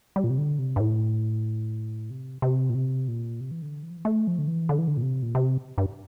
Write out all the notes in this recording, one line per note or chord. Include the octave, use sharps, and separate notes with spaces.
G3
A#2
C3
D3
C3
G2
A2
C3
C3
A#2
C3
A#2
C3
E3
D3
E3
F3
E3
A3
F3
D3
E3
D3
E3
D3
A#2
C3
A#2
C3
G2